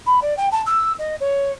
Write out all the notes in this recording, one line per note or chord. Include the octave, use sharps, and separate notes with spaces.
B5
D5
G5
A5
E6
D#5
C#5